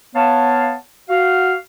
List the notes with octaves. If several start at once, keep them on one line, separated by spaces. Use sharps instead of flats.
B3 C#5 F5 A5
F#4 F5